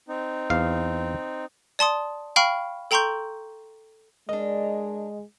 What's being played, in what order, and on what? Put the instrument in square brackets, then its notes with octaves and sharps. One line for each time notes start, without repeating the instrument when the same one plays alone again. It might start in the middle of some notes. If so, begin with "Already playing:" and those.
[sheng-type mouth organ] C4 D#4
[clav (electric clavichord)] E2 F5
[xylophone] D5 A5 C6 D#6
F5 G5 B5 C#6 F6
A4 G5 A#5 C6 C#6 G6
[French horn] G#3 [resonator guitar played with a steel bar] D4 A#4 [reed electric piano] D#5